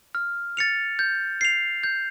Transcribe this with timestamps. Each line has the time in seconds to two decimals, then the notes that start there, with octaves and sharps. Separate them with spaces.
0.15 F6
0.57 A6 C#7 F7
0.99 G6
1.41 C7 F7
1.83 G6